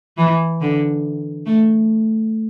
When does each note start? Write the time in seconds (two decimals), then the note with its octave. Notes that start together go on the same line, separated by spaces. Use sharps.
0.18 E3
0.61 D3
1.46 A3